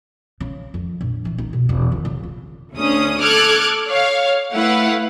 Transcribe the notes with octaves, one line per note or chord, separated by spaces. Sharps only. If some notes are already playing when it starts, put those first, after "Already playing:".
C#3
F2
A#1
E3
D#4
B2
E1
D#3
C#3
F4
D2 C#4 D#6
A4 D6 F6 F#6 G#6
C#5 F5
A3 E4 B4 F5 F#5